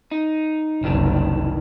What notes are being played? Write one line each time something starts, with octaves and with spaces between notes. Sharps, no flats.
D#4
F#1 C2 D#3 E3 D4